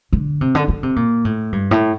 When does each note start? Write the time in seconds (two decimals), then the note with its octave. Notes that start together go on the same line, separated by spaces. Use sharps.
0.13 D3
0.41 C3
0.55 D3
0.68 D3
0.83 C3
0.96 A#2
1.25 A2
1.52 G2
1.71 A2